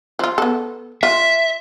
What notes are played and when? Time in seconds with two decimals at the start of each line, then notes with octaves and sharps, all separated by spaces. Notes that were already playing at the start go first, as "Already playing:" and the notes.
0.19 F3 F4
0.38 B3 A4
1.03 F4 E5